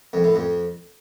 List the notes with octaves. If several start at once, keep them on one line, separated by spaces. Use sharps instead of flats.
F2
A2
F2